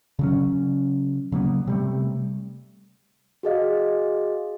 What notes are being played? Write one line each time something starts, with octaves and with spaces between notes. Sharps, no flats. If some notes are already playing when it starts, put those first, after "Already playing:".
C#3 F#3 C#4
C#3 F#3 A#3 B3
C3 G3 A3
F#4 G#4 D#5 F5